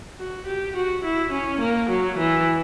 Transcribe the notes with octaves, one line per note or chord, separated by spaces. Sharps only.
F#4
G4
F#4
E4
C#4
A#3
F#3
E3